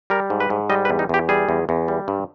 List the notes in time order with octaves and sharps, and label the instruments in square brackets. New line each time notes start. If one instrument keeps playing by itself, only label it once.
[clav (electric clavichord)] G3 A#4
G#2
B4
G#2
G3 D#5
B4
E2
D#4
E2 G4
G3 G#4
E2
E2
G3
G2